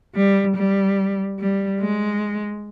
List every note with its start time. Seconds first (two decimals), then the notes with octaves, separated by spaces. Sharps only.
0.15 G3
0.56 G3
1.39 G3
1.81 G#3